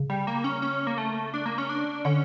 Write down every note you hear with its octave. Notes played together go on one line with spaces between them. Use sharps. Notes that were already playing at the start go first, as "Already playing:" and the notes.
Already playing: C#3
G3
A#3
C#4
C#4
A#3
A3
D4
A#3
C#4
D4
D3 C#4